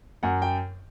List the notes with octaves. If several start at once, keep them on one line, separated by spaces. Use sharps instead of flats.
F#2 F#5
G5